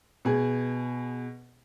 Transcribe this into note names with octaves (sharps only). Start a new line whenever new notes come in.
B2 G#4